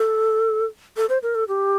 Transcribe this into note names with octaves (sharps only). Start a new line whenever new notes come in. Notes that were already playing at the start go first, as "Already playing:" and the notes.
Already playing: A4
A4
C5
A#4
A4
G4